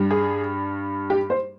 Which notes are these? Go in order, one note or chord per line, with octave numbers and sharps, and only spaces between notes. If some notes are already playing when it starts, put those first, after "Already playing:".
Already playing: G2 G3
G#4
G4
C5